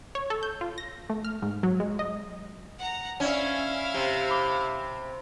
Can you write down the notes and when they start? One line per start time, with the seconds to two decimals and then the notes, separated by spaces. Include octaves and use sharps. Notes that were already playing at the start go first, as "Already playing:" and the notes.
0.15 C#5
0.30 A4
0.43 G6
0.61 F4
0.78 A#6
1.10 A3
1.25 F6
1.42 G#2
1.63 F#3
1.80 G#3
1.99 D#5
2.79 F#5 A#5
3.20 C#4 E4 D5 F5 F6 G#6
3.94 C3 G7
4.30 B5 D6 G7